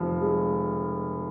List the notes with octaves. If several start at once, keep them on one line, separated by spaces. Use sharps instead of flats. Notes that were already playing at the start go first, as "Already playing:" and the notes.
Already playing: F1 F3
G#3